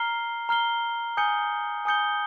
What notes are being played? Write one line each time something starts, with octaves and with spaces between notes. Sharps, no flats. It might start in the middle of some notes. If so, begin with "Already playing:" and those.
Already playing: A#5 F6 C7 G7
A#5 F6 C7 G7
G#5 D#6 G6 C#7 G7
G#5 D#6 G6 C#7 G7